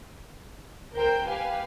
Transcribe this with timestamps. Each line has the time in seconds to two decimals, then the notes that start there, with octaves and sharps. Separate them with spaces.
0.93 C#2 A#4 C5 G5 G6
1.27 G4 B4 F5 G#5